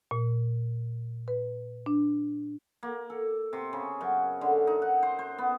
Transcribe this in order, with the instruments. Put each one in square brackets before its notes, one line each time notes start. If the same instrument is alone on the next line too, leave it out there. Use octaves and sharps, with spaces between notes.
[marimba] A#2
B4
D4
[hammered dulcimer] A#3
A4
C3
C#3
F#2
D3
D#4
F#5
C5
C5
B3